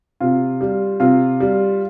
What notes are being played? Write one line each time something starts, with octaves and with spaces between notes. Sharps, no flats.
C3 F4
G3
C3 F4
G3